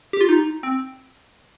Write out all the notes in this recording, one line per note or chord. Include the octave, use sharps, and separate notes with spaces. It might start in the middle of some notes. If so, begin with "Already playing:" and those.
G4
F4
D#4
C4